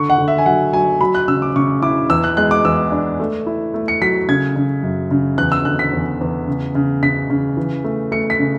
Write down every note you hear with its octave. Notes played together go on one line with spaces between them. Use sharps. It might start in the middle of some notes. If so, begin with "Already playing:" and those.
Already playing: D3 C#6
F#5
D3
E5
G#5
F#3 F#5
F#3 G#5
F#3 B5
F#6
C#3 E6
D6
C#3 C#6
E4 D6
E2 E6
F#6
G#3 F#6
D6
E2 E6
D4
A3
E4
A3
C#7
F#3 B6
C#3 G#6
C#3
F#2
C#3
E2 F#6
E6
D3 F#6
B6
E2
E2
C#3
C#3
C#3 B6
C#3
E3
A3
A3 C#7
B6
C#3